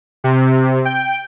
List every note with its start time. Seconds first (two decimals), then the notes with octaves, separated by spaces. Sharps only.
0.24 C3
0.85 G5